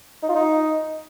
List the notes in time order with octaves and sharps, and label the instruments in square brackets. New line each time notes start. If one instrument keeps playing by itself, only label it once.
[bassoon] D#4
F4
D#4